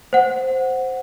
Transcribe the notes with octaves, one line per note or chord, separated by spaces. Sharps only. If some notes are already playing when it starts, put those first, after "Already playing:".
C5 F#5